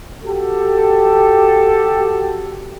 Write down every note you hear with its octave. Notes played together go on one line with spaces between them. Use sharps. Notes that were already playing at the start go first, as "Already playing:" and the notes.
F#4 G4 A4